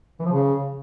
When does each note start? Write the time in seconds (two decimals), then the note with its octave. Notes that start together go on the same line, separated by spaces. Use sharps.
0.20 E3
0.26 F3
0.32 C#3